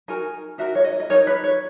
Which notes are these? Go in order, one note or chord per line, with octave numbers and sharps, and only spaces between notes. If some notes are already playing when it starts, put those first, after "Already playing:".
D#4 F#4 A#4 G#5
D#4 F#4 A#4 E5
C#5
D#5
D#5
D#4 A#4 C#5
B4
C#5